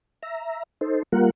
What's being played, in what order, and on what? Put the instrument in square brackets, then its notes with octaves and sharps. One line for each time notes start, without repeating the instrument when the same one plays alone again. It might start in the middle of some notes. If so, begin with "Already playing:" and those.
[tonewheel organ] E5 A#5
D#4 A4 C5
G3 A#3 F4 A#4 F#5